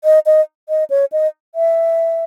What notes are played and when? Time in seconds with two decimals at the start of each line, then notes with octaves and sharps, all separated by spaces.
0.04 D#5
0.26 D#5
0.69 D#5
0.90 C#5
1.12 D#5
1.55 E5